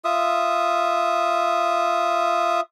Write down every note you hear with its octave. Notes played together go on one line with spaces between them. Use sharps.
F4 E5 D#6